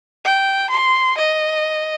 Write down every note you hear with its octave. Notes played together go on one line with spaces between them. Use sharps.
G5
C6
D#5